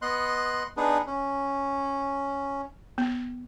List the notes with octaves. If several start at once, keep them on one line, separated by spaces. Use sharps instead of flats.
B3 D#5 C6 F#6
B3 D4 D#4 G#4 B4
C#4
B3